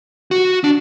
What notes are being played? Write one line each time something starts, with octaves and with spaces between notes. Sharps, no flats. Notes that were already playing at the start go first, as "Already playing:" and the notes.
F#4
D4